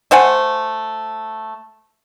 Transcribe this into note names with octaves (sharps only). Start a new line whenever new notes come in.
A3 C5 F#5 G#5